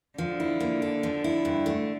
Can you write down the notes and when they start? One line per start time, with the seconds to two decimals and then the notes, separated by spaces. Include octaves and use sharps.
0.18 D3 F3
0.40 E4
0.60 A#3
0.82 A4
1.03 F3
1.24 E4
1.45 G2
1.66 A3